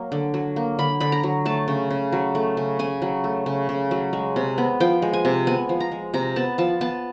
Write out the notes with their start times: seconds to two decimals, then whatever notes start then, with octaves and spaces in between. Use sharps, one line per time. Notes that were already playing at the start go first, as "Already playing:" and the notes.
Already playing: F#3 A#3
0.12 D3
0.34 F#3
0.56 A#3
0.79 D3 B5
1.00 D3 B5
1.12 A#5
1.23 F#3
1.45 A3 A5
1.68 C#3
1.91 C#3
2.12 F#3
2.35 A3
2.57 C#3
2.79 C#3 G#5
3.02 F#3
3.24 A3
3.46 C#3
3.69 C#3
3.91 F#3
4.13 G#3
4.36 C3
4.58 B3
4.80 F3 G5
5.02 G#3
5.13 G#5
5.25 C3
5.47 B3 G#5
5.69 F3
5.80 A#5
5.92 G#3
6.14 C3 A#5
6.36 B3 A5
6.58 F3 A5
6.81 B3 A5